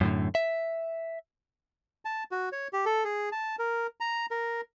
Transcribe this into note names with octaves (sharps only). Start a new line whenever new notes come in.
F#2 A2 D3
E5
A5
F#4
C#5
G4
A4
G#4
A5
A#4
A#5
A#4